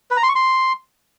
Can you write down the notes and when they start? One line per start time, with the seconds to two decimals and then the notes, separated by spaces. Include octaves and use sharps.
0.11 B4
0.17 A#5
0.23 C6
0.29 C#6
0.35 C6